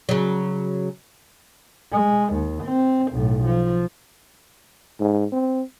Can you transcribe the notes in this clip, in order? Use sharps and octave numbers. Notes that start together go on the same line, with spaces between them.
C#3 F#3
G#3
D#2
C4
B1 A2
F3
G#2
C4